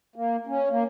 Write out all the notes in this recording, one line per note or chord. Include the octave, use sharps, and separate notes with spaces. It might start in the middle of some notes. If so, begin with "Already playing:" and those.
A#3
C#4
A#3